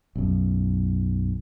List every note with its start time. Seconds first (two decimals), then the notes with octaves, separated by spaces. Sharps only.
0.16 B1 F#2